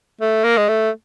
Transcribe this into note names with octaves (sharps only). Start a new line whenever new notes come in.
A3
A#3
G#3
A3